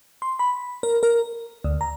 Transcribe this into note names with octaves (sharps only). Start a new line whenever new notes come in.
C6
B5
A#4
A#4
D2
A#5